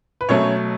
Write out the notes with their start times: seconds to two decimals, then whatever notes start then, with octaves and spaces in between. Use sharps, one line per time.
0.21 B4
0.29 B2 F#3 A3 C#4 C#5